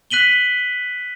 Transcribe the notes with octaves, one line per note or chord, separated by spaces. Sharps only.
F#6 B6 D#7 F#7 G7